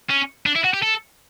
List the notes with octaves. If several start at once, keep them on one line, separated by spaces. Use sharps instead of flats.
C#4
D4
E4
F#4
G4
A4